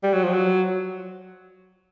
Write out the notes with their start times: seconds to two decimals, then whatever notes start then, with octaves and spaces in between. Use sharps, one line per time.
0.03 G3
0.13 F#3
0.24 F3
0.33 F#3